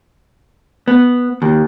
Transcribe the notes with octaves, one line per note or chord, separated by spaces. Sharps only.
B3
D#2